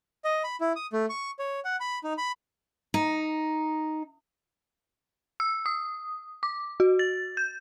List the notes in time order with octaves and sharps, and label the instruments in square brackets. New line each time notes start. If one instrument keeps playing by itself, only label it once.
[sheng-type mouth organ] D#5
B5
E4
D#6
A3
C#6
C#5
F#5
B5
D#4
B5
[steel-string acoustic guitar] D#4
[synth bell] E6
D#6
D6
F#4
A6
G6